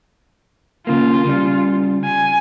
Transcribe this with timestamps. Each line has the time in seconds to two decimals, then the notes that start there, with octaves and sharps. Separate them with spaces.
0.87 D#2 C#3 A#3 F4
1.24 C#3 G3
2.05 G#5